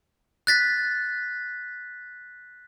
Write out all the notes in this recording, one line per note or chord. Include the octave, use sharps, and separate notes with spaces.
F#6 A6 B6